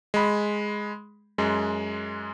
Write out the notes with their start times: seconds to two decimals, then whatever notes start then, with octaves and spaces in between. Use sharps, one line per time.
0.14 G#3 B5
1.38 F#2 G#3